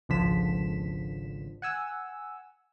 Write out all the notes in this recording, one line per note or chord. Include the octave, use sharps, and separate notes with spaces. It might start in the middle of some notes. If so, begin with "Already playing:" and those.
G#1 C#2 D3 F3 B6 E7
F#5 G#5 E6